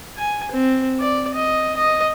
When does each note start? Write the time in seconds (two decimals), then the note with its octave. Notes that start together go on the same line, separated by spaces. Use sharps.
0.17 G#5
0.51 C4
1.00 D5
1.35 D#5
1.77 D#5